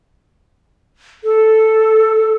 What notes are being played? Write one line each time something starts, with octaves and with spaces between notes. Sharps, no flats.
A4